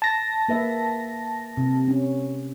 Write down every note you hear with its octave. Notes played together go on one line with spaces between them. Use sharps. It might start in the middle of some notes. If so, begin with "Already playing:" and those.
A5 A#6
A#3 B4 E5
C3
C#4